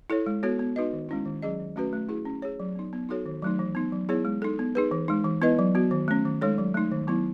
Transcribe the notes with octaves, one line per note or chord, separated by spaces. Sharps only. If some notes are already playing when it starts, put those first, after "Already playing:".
E4 A4 C#5
G#3
B3 F#4 A4 C#5
B3
D#4 F#4 B4 D#5
D#3
G#3 C#4 E4
D#3
F#3 C#4 G#4 D#5
D#3
A3 C#4 F#4 B4
A3
E4 G#4
C#4
G#4 C#5
F#3
B3 D#4
B3
D#4 F#4 A4 C#5
D#3
F#3 A3 D#4
E3
B3 D#4
F#3
B3 E4 G#4 C#5
G#3
D#4 A4
B3
D#4 G#4 B4
E3
G#3 D#4
E3
B3 E4 B4 D#5
F#3
B3 F#4
D#3
A3 C#4
D#3
G#3 D#4 A4 C#5
F#3
A3 D#4
D#3
F#3 B3 E4